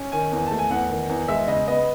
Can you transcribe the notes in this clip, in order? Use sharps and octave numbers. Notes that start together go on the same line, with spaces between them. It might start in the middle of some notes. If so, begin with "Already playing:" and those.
Already playing: C#4
D#3 G#5
E2
A3 A5
G#5
E2 F#5
D#3
E2
G#3 E5
C#3 D#5
B3 D#5